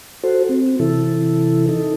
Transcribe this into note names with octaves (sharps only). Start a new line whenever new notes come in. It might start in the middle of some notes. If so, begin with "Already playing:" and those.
F#4 A4 C5
C4
C3 E3 E4 A4
D#4 A4